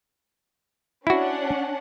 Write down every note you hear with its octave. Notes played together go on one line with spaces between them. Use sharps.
C#4 D4 E4 F#4 F#5